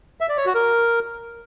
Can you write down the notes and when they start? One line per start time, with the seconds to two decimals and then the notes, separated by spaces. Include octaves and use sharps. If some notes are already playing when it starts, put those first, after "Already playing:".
0.21 E5
0.29 D5
0.37 C#5
0.46 F#4
0.54 A#4